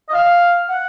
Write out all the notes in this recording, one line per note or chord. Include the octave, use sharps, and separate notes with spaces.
D#5
F5
F#5